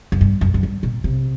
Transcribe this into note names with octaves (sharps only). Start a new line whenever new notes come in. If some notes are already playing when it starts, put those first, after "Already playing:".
F#2
G2
F#2
F#2
G2
A#2
C3